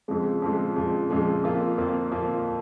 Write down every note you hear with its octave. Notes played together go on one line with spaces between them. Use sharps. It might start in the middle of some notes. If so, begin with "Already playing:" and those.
F2 C#3 F3 G#3
F2 C#3 F3 G#3
F2 C#3 F3 G#3
F2 C#3 F3 G#3
F2 F3 A#3 F4
F2 F3 A#3 F4
F2 F3 A#3 F4